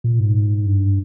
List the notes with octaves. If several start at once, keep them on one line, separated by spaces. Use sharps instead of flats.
A#2
G#2
G2